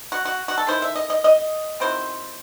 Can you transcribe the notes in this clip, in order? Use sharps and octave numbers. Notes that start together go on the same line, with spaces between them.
F#4
F#4
F#4
A4
D#3 A3 E4 C5
E5
D#5
D#5
D#5
D#3 F#3 C4 E4 C5